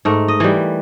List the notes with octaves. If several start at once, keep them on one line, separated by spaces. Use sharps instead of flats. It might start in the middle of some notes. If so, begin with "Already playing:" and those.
G#2 A3 A#4
D#5
E3 G3